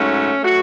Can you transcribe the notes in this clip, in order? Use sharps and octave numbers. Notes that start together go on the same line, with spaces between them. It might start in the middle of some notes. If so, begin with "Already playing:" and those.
Already playing: G#2 F#3 A3 C#4
F#3 A3 F#4